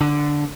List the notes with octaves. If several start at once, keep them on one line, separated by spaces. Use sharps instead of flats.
D3